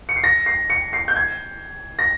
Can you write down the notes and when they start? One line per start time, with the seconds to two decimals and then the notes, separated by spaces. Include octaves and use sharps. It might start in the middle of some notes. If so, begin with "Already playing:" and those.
0.09 C#7
0.16 C7
0.24 A#6
0.46 C7
0.70 C#7
0.93 C7
1.08 G6
1.16 G#6
1.99 A#6